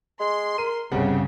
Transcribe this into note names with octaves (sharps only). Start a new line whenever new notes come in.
G#3 C6
A#4 D#7
G1 C2 G#2 C#3 G3 F#5